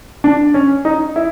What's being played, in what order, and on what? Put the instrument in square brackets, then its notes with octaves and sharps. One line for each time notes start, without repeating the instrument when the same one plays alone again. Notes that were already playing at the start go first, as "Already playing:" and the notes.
[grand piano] D4
C#4
D#4
E4